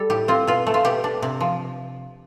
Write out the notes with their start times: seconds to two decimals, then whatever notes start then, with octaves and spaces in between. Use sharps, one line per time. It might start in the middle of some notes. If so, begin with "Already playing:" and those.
Already playing: G3 A4
0.10 A2 G4
0.28 C4 F4
0.47 B2 F4
0.67 A3
0.74 F4
0.85 B2 G4
1.04 D4
1.22 C3
1.40 F3